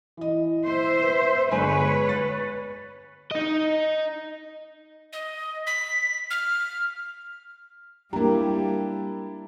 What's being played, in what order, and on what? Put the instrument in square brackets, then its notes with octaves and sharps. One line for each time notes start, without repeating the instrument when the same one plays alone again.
[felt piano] E3 D#5
[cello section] C5 E5
[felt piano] B4
[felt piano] G1 G#3 G#5 [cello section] B4 C#5
[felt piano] F#6 A6
[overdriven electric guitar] D#4 D#5
[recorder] D#5
B6
F6
[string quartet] G3 [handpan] A#3 G4 [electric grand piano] D4 E4 [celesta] A#5